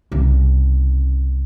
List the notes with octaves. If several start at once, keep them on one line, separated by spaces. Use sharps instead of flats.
C2 C#3